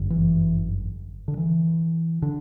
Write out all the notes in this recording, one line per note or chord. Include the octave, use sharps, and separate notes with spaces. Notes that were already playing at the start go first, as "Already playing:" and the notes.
Already playing: G1 F#2 D3
E3
D3
E3
D3